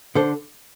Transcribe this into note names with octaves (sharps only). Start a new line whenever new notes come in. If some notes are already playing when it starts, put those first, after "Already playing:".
D3 A4 C5